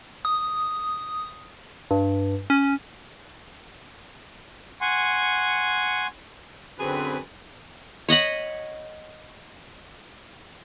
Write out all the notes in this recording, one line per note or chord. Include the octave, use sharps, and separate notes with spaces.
D#6
G2
C#4
F#5 G#5 C6 C#6
F#2 D3 C4 G#4 B4
C#5 D#5 F#5 B5